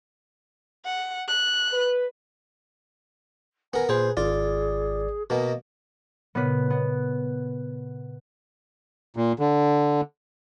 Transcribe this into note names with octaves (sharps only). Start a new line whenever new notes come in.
F#5
F#6
B4
B3 A#4 G#5
A#2 G#4 B4 C5
G#1 F4 G#4 D5
B2 A#3 D#5
A#2 C#3 B3 B4
B3
A#2
D3